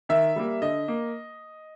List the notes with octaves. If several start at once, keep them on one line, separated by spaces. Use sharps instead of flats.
D#3 E5
G3 A#3
D3 D#5
A#3